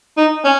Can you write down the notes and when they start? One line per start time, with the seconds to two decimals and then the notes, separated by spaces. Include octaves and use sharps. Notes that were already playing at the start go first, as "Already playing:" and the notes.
0.17 D#4
0.45 C#4